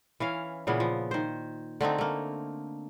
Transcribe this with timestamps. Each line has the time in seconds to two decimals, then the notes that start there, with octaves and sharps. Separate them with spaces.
0.20 E3 C#4 F5
0.67 A#2 C#3 E3 B3
0.80 F3
1.11 D#3 C5
1.81 D3 A3 C4 D#4
1.98 A3 A#3